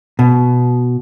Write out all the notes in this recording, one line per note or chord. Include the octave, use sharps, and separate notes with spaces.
B2